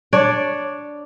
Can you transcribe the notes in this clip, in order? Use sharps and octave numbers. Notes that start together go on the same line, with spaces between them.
D4 C#5 D5